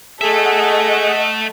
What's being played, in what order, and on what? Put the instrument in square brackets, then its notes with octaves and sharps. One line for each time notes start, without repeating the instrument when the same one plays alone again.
[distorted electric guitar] A3 E5 [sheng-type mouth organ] G#4 [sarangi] A4 [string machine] D#5 F#5